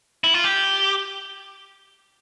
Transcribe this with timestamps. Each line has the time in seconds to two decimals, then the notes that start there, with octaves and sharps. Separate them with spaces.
0.24 E4
0.34 F4
0.44 G4